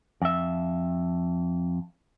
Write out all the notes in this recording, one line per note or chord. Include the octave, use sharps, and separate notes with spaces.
F2 E5